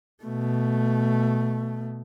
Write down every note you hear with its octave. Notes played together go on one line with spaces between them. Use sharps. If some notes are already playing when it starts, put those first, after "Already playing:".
B2 A3